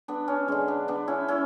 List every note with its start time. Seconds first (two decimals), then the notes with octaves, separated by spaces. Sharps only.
0.08 B3 D4
0.28 C#4
0.48 D3 G#3 C#4
0.68 B3 D4
0.88 B3 D4
1.08 C#4 E4
1.28 C#4 E4